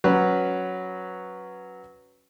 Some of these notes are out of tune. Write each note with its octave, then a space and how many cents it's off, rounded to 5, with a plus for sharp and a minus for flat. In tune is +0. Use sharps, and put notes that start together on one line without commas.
F#3 +0 C#4 +0 B4 +0